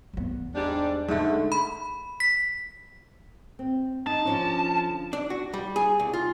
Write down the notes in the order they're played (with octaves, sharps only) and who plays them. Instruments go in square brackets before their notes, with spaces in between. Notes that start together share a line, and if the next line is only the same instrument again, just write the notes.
[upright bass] E2 B3
[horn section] G#2 G3 D4
[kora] G#2 D3 [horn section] A3 [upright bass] D#4
[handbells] B5
B6
[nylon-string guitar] C4
[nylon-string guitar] D#4 [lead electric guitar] A5
[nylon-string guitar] D3 F3 C#4
[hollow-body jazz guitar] D4
F#4
G3
G#4
C2
F4